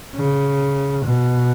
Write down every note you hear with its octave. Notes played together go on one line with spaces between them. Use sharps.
C#3
B2